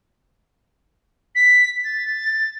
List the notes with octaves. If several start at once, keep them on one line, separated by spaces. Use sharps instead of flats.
B6
A6